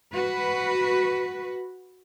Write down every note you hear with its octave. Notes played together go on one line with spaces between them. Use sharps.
F#4 B4